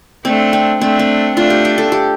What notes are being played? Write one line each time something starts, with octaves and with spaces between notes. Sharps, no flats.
A3 C4 D4
C4
A3 C4 D4
C4
A3 D4 F4
G4
G4
A4
G4